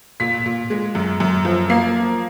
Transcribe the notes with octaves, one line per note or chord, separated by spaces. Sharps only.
A#2 B6
A#2
G#3
F#2
F#2
F3
A#3 C7